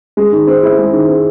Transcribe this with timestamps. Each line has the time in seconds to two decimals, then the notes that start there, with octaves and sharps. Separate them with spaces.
0.17 G#3
0.33 D#3
0.47 C4
0.63 E4
0.78 G#3
0.93 D#3
1.09 C4